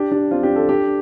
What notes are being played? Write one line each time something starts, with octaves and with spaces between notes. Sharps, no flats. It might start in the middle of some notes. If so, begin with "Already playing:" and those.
Already playing: D4 G4
D4 G4
C4 F4
D4 G4
F4 A4
D4 G4